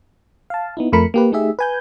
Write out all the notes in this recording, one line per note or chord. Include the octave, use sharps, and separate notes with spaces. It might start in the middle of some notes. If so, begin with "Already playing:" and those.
F5 A5
B3 D#4 E4
F2 F3 A3 A#4 B5 C#7
A#3 G4 B4
A3 D#4 G4 G#4 E5
B4 G#5 G6